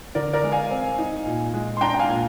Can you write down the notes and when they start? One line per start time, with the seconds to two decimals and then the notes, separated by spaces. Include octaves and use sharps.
0.15 D3 A#4 D5
0.33 A#4 D5
0.43 G#3
0.52 F5 G#5
0.70 C4
0.98 D#4
1.26 A#2
1.54 G#3
1.77 C6
1.81 D4 G5 A#5
1.94 G5
1.99 F5 G#5
2.09 A#2